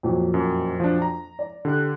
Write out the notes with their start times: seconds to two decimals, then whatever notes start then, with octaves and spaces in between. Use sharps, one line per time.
0.03 F2 A#2 F#3
0.34 F#2
0.80 F3 D4
1.02 A#5
1.39 D5
1.65 D3 G4 F#6